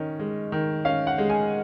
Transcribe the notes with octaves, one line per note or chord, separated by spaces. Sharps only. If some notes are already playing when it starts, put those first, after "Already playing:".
Already playing: D#3 C#4
G#3
D#3
C#4 F5
F#5
G#3
G#5